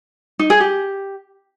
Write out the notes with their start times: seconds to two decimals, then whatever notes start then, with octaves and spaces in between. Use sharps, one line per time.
0.39 D#4
0.50 G#4
0.60 G4